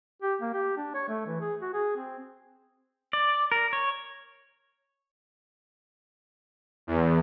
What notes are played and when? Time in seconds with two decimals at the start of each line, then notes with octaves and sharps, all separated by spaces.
0.22 G4
0.42 A#3
0.54 G4
0.77 D4
0.94 C#5
1.08 A3
1.26 E3
1.41 G#4
1.61 F#4
1.74 G#4
1.96 C4
3.13 D5
3.52 A#4
3.73 C#5
6.87 E2